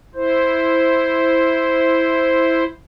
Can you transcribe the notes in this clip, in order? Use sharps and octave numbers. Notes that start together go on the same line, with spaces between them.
E4 C5